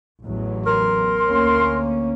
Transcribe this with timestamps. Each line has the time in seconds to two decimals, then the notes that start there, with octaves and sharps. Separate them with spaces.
0.23 A1 E2 F#3
0.66 A#4 C6
1.26 D2 A#3 C#4